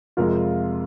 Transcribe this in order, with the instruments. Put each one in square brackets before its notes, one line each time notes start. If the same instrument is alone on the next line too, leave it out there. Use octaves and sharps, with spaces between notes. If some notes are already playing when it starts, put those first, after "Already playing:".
[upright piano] F2 C3 F3 G#3 F4 A#4